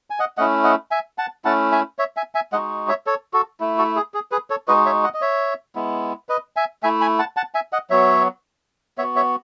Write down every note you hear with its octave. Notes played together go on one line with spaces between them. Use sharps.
G#5
D#5 F#5
A3 C#4 E4 D#5 F#5
D#5 F#5
E5 G#5
F#5 A5
A3 C#4 E4 F#5 A5
E5 G#5
C#5 E5
E5 G#5
E5 G#5
G#3 D#4 F#4 D#5 F#5
C#5 E5
A4 C#5
F#4 A4
A3 E4
F#4 A4
G#4
G#4
G#4 B4
A4 C#5
G#3 D#4 F#4 B4 D#5
C#5 E5
D#5 F#5
D#5
C#5 E5
G#3 B3 E4
B4 D#5
E5 G#5
A3 E4 E5 G#5
G#5 B5
F#5 A5
F#5 A5
E5 G#5
D#5 F#5
F#3 B3 F#4 C#5 E5
B3 F#4 C#5 E5
C#5 E5